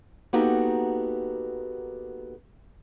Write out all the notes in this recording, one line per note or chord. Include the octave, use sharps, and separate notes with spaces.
A#3 B3 D#4 F#4 G4 A4